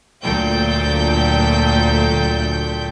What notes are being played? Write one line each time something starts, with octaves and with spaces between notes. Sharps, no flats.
D2 A#2 F#3 A4 G5 G6